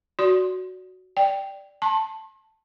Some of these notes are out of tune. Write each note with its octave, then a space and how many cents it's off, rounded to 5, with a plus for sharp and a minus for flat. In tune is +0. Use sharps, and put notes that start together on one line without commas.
F#4 +0 D5 -20 C6 +0
D5 +0 G5 +0
A5 +0 C6 +45